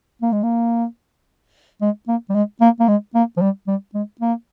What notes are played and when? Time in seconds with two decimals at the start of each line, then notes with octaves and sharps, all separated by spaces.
0.22 A#3
0.32 G#3
0.43 A#3
1.82 G#3
2.08 A#3
2.29 G3
2.34 G#3
2.61 A#3
2.80 A#3
2.88 G#3
3.15 A#3
3.37 F3
3.41 G3
3.68 G3
3.94 G#3
4.21 A#3